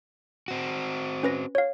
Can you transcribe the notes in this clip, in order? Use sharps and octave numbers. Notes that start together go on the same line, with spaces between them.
C4 F#4
C#4 B4 A#6
C#5 F5